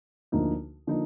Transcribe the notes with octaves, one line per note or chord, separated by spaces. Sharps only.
D2 D3 F3 A#3 D#4
D3 F3 A#3 D#4